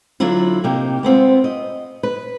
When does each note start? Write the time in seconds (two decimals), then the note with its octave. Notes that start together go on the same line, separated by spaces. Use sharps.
0.20 D3 F#3 D4 E4 F4
0.64 C3 A#3 D#4 G4
1.03 G#3 B3 C4 F4
1.44 D#5
2.03 B4